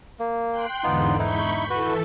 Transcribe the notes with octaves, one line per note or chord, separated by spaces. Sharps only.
A#3
G5 C6 F#6
E2 G#2 D3 B3 D#4 F4
D#4 E4 B5 C#6 G6
E3 F#4 A4 B4